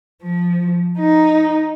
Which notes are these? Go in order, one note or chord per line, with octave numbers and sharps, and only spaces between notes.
F3
D#4